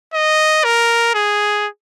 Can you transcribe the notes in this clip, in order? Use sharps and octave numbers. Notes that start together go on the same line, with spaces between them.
D#5
A#4
G#4